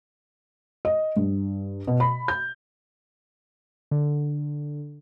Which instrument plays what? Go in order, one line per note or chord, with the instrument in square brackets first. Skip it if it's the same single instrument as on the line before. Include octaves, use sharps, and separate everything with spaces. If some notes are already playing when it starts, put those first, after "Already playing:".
[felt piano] D#5
G2
B2
B5
G6
[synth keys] D3